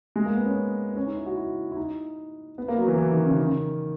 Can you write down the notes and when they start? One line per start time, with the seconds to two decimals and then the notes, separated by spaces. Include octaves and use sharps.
0.16 G#3
0.25 A#3
0.36 B3
0.46 C#4
0.91 B3
0.97 C#4
1.07 D#4
1.17 E4
1.26 F#4
1.37 E4
1.72 E4
1.77 D#4
2.58 B3
2.68 A#3
2.78 F#3
2.88 E3
2.98 E3
3.12 D#3
3.26 C#3
3.36 D#3
3.46 C#3